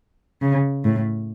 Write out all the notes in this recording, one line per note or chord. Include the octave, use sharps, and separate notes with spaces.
C#3
A2